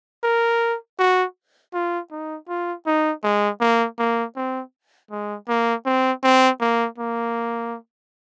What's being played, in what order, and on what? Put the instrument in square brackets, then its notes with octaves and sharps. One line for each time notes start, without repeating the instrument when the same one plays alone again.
[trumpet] A#4
F#4
F4
D#4
F4
D#4
G#3
A#3
A#3
C4
G#3
A#3
C4
C4
A#3
A#3